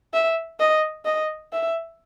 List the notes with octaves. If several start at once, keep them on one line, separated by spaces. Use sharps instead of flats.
E5
D#5
D#5
E5